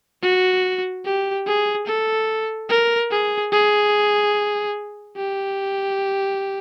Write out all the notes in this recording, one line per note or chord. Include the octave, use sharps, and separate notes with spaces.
F#4
G4
G#4
A4
A#4
G#4
G#4
G4